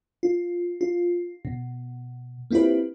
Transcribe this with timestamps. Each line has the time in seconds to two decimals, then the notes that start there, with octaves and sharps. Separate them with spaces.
0.23 F4
0.81 F4
1.45 B2
2.51 A#3 C4 E4 F4 G4 B4